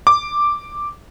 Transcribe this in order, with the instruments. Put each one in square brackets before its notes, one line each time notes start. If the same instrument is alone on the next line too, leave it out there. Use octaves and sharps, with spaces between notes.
[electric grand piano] D6